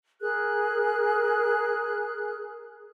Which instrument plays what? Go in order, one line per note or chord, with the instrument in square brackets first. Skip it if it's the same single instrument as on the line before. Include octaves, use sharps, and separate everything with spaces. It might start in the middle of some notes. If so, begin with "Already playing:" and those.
[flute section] G#4 A#4 F#6